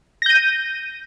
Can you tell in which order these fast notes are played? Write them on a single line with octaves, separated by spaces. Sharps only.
A#6 G6 D#7